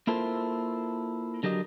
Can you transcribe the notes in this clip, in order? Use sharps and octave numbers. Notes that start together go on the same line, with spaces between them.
A#3 E4 F4 A4 A#4 C5
D3 F#3 G4 A#4 D#5